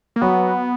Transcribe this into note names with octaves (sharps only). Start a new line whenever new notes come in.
A#3
F#3 B3 F#4